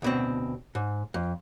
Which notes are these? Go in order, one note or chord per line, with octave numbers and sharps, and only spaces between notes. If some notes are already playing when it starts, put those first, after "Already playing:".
D2 B2 C4
G#2
F2